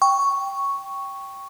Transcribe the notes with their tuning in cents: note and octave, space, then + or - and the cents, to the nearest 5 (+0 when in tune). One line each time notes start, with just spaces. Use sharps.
G5 +0 C#6 +0